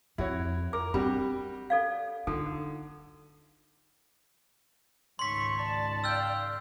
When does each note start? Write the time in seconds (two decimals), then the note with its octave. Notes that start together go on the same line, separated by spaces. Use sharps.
0.18 F2 E4 F#4 C#5
0.73 A#4 D6
0.94 G3 C4 D4 F#4 G4 B5
1.70 A4 D5 F5
2.27 D3 D#4 A4
5.19 C#2 G#2 D#3 A3 C#5 C6 C#6 B6
5.58 D5 A5
6.04 F5 G5 E6 F6 G6